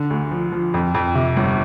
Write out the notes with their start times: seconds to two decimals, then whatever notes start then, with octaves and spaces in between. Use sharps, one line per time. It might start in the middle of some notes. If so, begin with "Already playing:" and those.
Already playing: D3 D4
0.10 D2
0.31 F3
0.52 F3
0.74 F2
0.94 F2
1.15 C3
1.37 G1